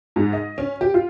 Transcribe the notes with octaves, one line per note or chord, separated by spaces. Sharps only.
G#2
D#5
C#4
G4
F4